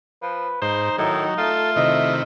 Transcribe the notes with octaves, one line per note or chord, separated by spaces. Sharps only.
F3 B4
G#2 D#4 C5
A2 D#3 F#3 D#4
A3 F4 A4
C3 D#3 E4 D#5